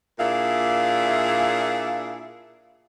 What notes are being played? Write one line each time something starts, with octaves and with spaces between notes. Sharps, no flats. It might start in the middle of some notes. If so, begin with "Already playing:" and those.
A#2 D4 E4 G#4 E5 F5